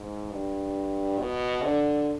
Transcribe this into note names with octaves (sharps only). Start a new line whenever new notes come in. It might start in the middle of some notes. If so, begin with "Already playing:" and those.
Already playing: G#2
G2
B2
D3